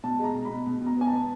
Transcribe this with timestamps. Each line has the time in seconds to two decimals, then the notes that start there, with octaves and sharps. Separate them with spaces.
0.04 B2 A5
0.19 G#3 A#5
0.35 B2
0.45 B2 B5
0.66 B2
0.81 B2
0.86 A#5
0.97 B3 G#5
1.07 A5
1.13 B3